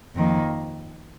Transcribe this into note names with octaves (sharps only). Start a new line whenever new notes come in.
F2 D#3 A#3